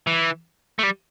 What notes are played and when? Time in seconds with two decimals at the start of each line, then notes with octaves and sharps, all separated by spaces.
0.07 E3
0.79 A3
0.83 G3